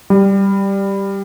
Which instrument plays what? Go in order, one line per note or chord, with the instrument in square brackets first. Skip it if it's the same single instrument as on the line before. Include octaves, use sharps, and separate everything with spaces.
[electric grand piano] G3